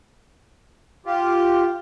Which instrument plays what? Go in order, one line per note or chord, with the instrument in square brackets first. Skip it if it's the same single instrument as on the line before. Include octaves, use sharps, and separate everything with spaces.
[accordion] F4 G4